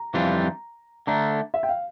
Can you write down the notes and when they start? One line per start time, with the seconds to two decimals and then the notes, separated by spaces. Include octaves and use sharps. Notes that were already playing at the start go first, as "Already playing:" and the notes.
Already playing: A#5
0.14 F2 E3 G3 D4 F4
1.07 D3 A3 D4 A#5
1.54 E5
1.63 G5
1.69 F5